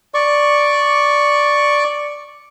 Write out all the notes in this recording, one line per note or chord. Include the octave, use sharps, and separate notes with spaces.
D5 C#6